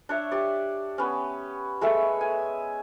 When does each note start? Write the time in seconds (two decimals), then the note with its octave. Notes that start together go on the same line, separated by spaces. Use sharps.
0.09 D4 C#5 E5
0.32 G4 D5
0.98 B3 C#4
1.81 G#3 A3 A4 E5
2.21 G#5